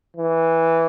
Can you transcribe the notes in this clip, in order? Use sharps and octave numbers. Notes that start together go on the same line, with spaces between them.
E3